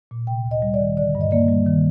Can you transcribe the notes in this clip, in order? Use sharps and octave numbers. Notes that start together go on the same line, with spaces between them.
A#2
C3 G5
D2
D#5
G3
D5
D#3
D3 D5
G2
D#5
A#3 D5
G3
D#3